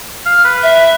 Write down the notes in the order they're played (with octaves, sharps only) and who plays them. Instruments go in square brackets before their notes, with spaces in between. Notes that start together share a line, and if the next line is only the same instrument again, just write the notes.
[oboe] F5
B4
[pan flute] E5